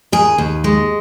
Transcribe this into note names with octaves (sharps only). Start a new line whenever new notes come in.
D#2 G#4
D#2
G#3